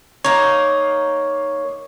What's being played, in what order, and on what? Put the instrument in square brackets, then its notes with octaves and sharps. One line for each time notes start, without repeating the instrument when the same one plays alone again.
[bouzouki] A#3 D#4 [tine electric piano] C#5